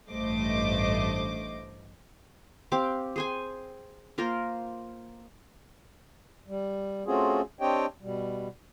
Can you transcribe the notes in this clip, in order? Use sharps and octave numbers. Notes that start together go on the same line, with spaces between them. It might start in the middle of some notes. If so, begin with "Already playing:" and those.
A1 G2 A3 C5 D#5 D6
C4 G4 F5 D6
G#4 C5 G#5
A#3 F4 A#4 C5
G3
A3 C4 C#4 F4 F#4 G#4
C4 D4 G4 C#5 D#5 G5
B2 G3